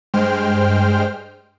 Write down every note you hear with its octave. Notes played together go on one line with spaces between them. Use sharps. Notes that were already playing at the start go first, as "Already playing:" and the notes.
G2 G#3 C5 G5 F6